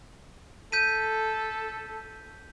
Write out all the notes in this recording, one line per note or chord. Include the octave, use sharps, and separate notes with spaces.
A4 G6 B6 D#7